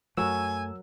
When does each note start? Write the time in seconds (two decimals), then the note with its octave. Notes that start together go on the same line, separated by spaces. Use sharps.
0.17 F#2 F#3 A3 A#4 G#5 E6